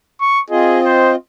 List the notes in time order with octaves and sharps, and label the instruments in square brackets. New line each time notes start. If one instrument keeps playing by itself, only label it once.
[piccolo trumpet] C#6
[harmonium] C4 F4 D#5 [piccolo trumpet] G#4
[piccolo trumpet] C5